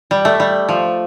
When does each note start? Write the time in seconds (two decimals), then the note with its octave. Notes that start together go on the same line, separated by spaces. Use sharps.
0.11 G3
0.25 A3
0.40 G3
0.69 F3